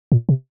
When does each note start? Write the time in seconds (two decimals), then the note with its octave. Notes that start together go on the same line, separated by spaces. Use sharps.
0.12 A#2
0.29 C3